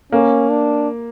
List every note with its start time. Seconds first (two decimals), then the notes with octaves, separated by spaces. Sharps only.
0.12 A#3 C#4
0.50 D4